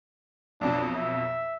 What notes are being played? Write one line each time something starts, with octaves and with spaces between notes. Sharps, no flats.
B1 F2 B2 D4
E5